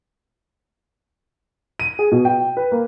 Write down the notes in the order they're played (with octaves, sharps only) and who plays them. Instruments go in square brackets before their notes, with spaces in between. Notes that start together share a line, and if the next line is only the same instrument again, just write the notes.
[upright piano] D#7
G#4
B2
G5
B4
A#3